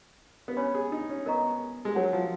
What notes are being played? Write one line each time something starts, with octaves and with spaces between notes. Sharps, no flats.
B3
C#4 C#5 G#5 B5
G#4
D#4
C#4
B3 A#4 D#5 A#5 C#6
G#3
F#3 A#4 C#5 F#5
F3